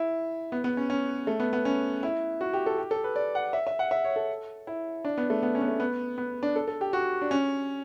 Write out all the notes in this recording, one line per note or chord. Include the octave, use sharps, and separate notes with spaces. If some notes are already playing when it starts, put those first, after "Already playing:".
Already playing: E4
B3
B3
C#4
C#4
A3
B3
B3
C#4
E4
F#4
G4
A4
G4
A4
B4
D5
F#5
E5
E5
F#5
E5
C#5
A4
E4
D4
B3
A3
B3
C#4
B3
A3
B3
B3
D4
A4
A4
G4
F#4
D4
C#4